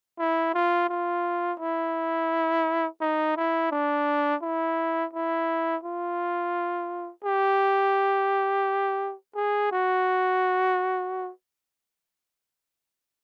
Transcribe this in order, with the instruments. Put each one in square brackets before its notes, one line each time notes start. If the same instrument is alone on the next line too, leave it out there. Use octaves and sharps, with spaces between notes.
[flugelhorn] E4
F4
F4
E4
D#4
E4
D4
E4
E4
F4
G4
G#4
F#4